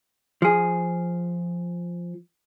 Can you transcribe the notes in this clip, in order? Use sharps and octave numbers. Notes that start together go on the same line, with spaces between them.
F3 G#4